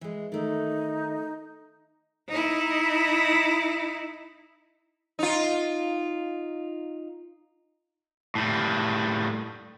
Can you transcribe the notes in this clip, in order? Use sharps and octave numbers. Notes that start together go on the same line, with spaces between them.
E3 G#3
D#3 A3 D#4
D#4 E4
D#4 F4
A2 G3